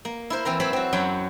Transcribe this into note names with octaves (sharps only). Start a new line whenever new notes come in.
A#3
E4 A#4 C5
E3 C4 C5 A#5
F#3 C4 C5 C#5 A5 B5
C4 F#4
F#2 F#3 F#5 G5 B5